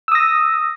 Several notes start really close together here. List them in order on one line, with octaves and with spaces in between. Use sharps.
E6 D#6 A#6